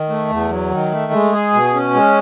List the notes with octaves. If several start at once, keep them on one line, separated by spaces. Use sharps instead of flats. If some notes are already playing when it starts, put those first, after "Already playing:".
Already playing: D#3
A3
E2
F#3
D#3
A3
G#3
G#4
B2
C#4
G#3